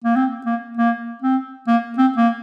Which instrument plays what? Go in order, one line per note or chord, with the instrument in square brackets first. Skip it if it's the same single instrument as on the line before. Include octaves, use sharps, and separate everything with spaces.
[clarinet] A#3
C4
A#3
A#3
C4
A#3
C4
A#3